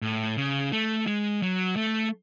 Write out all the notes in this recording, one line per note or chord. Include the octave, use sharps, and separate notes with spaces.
A2
C#3
A3
G#3
F#3
A3